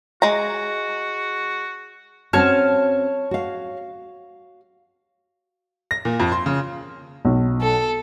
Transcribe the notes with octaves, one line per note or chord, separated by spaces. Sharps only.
G#3 F#4 A#5
C4 C#4 F#4 C#5 A5 F6
F#4 F5
A#6
A#2
F2
C6
C#3
B1
A4